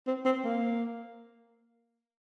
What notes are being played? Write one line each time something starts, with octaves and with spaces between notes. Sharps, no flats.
C4
C4
A#3